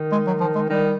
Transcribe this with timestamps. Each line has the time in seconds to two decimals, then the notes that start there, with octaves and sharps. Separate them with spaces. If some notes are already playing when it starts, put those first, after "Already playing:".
Already playing: D#3
0.12 G#3
0.27 F#3
0.41 F3
0.55 G#3
0.70 D#3 G3